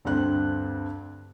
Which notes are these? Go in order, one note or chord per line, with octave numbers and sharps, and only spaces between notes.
D2 G2 C4 F#6